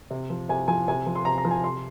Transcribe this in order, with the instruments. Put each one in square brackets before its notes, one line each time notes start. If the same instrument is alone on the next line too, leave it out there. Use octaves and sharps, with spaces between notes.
[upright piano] C3
F3
C3 G#5
F3 G#5
C3 G#5
F3
C6
C3 A#5
A#5
F3
G#5
C3 C6